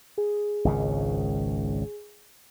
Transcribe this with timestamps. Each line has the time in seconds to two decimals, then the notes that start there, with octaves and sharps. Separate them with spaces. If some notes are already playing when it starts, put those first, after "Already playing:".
0.18 G#4
0.65 G#1 C#2 C#3